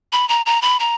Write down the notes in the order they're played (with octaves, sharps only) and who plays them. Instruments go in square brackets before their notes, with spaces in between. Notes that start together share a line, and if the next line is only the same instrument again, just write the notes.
[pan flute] B5
A#5
A#5
B5
A#5